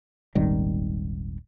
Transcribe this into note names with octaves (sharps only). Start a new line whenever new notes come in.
D#1 G#1 D#3 G3